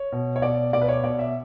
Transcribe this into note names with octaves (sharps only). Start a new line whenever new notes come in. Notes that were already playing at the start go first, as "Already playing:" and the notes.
Already playing: C#5
B2
C#5
B2 D5
B2 D5
B4
C#5
B2 D5
E5